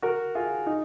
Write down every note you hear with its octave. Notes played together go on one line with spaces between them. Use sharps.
F#4 A#4
F4 G#4
D#4